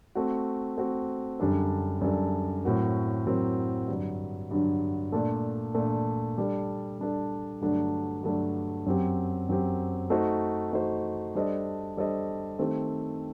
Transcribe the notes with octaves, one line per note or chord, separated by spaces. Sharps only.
A3 C4 F#4
A3 C4 F#4
F#2 D3 G3 D4 A4
F#2 D3 G3 D4 A4
A2 F#3 C4 F#4 A#4
A2 F#3 C4 F#4 A#4
G2 D3 F#3
G2 D3 F#3
A#2 A3 D4
A#2 A3 D4
G3 D4 A4
G3 D4 A4
G2 D3 F#3 A3 D4
G2 D3 F#3 A3 D4
F#2 F#3 C4 G4
F#2 F#3 C4 G4
A3 D#4 F#4 C5
A3 D#4 F#4 C5
G3 D4 A4 C5 D#5
G3 D4 A4 C5 D#5
D#3 A3 C4 G4 C5